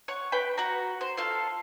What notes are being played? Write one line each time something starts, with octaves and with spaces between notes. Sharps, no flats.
C#5 F#5 C#6
B4 G5 B5
F#4 F#5 A#5
C5
F4 A4 F5